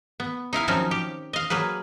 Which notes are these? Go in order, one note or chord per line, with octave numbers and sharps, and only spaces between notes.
B3
D#4 E4 F5 G#5
D#3 F3 F#3 C4 C#4 D#4
G4
D#5 F5
F#3 A#3 G#4 B4